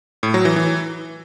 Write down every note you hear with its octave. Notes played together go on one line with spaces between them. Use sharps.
A2
F#3
E3
E3